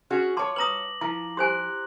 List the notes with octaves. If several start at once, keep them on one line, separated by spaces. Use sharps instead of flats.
C#4 F#4 G#4
F4 C#5 A5 C6 D6
B4 A#5 D#6 A#6 F#7
F3 E4 A#5
G4 C5 G#5 C6 F#6